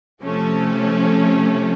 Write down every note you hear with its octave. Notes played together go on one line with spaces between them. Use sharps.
C3 F3 A3 C#4 A4